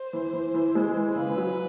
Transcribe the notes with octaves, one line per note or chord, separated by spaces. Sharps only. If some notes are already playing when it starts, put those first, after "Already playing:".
Already playing: C5
E3
E3
E3
G#3
E3
C#3 B4
F#3